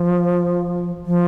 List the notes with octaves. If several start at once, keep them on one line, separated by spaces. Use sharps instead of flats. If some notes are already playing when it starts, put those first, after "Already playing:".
Already playing: F3
F3